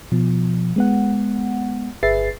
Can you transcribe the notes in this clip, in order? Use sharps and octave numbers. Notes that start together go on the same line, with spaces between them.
B2 F3
G#3 B3 F#5
G1 G#4 B4 E5 A6 C7